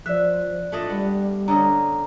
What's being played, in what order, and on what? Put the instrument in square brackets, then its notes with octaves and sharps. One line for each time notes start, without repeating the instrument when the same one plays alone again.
[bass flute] F3 [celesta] D5 F#6 [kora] E5
[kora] A3 D4 D#5 [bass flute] F4
[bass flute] G3 [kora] B3
[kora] D3 C#4 D#5 [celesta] A#5